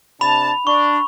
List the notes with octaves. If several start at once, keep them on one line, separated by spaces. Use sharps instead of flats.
C3 D4 A5 B5 F7
D4 C#6